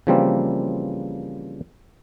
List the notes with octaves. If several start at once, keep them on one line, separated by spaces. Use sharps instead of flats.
C#3 E3 F3 G3 A#3 C4